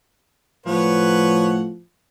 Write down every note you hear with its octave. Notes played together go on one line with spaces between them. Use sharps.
A2 F3 B4 C#5 F#5